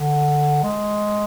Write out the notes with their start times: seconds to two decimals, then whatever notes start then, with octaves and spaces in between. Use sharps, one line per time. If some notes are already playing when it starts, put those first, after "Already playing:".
Already playing: D3
0.63 G#3